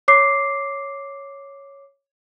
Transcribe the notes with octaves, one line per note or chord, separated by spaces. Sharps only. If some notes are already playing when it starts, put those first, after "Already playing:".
C#5 D6 C7